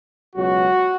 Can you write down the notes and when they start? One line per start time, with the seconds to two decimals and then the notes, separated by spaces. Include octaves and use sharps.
0.36 C#2 B2 F#3 F#4